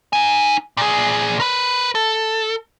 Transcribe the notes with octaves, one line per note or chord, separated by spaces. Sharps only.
D#4 G#5
A#2 G#4
A#4 B4
A4